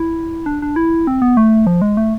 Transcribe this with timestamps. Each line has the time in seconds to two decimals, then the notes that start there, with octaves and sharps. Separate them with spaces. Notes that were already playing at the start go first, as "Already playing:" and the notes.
Already playing: E4
0.46 D4
0.62 D4
0.76 E4
1.07 C4
1.22 B3
1.37 A3
1.67 F3
1.82 G#3
1.97 A3